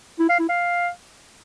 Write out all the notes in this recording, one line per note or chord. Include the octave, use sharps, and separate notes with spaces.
E4
F5
E4
F5